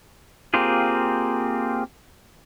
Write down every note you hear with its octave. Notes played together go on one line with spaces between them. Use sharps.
A#3 C4 F4 G4 G#4